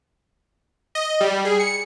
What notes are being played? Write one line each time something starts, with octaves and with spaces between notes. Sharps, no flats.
D#5
G3
G#4
C#7